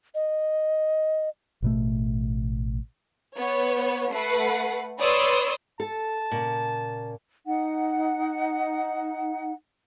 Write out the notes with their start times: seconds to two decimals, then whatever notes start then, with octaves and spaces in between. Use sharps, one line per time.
0.15 D#5
1.62 A1 B2 A3
3.37 B3 C#5
4.12 A3 B4 F#5 C7
4.99 B4 C#5 D5 C6 D#6 E6
5.80 A4 A5
6.32 A#2 C#3
7.45 D#4 F#5